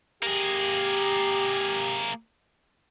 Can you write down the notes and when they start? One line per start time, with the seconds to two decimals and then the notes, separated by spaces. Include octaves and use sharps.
0.23 A#3 G4 G#4